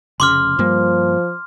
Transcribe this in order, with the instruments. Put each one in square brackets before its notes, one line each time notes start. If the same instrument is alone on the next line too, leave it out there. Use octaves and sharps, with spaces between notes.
[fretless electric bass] F1 C#3 [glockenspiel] C6 D6 F6
[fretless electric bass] G2 G3 A#3 [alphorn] F3